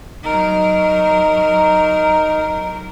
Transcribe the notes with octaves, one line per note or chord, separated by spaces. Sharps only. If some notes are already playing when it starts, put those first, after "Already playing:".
F#3 D#4 A#4